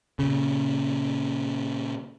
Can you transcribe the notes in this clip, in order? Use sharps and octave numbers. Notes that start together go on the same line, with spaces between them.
A#2 C#3